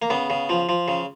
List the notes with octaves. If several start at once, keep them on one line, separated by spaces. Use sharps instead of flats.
A#3
C#3 B3
C#3
F3
F3
C#3